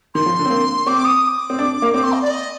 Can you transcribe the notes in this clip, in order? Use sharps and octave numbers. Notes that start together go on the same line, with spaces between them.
D#3 C6
F3
D3
C4
A#3
C4 D6
D#6
D#6
D6
C4
D4
A#3
C4 D6
C6
D#5
D5
D#5